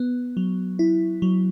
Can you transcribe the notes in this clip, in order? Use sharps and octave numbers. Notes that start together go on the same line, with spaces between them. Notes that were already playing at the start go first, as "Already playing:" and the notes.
Already playing: B3
F#3
E4
F#3